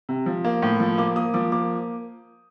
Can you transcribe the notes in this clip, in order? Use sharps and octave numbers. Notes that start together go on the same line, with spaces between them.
C3
F3
A#3
A2
F3
A#3 D6
A#3 D#6
F3 D6
A#3 D6